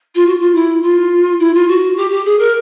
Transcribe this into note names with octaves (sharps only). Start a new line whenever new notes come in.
F4
F#4
F4
E4
F4
E4
F4
F#4
G4
G4
G#4
A#4